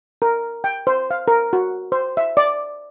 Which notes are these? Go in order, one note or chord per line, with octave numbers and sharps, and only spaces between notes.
A#4
G5
C5
F5
A#4
F#4
C5
E5
D5